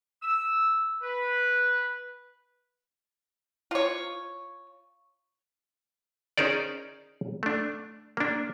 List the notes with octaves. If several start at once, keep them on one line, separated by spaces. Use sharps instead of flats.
E6
B4
F4 C#5
C#4 D#4 G#4 A#4 C5 D5
A3 D4
A#3 D4